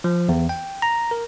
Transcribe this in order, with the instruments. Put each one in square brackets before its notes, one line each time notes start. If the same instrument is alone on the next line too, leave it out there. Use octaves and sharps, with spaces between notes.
[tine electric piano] F3
E2
G5
A#5
A#4